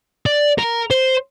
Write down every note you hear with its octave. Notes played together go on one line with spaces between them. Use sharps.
D5
A#4
C5